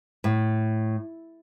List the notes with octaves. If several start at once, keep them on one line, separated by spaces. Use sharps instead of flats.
A2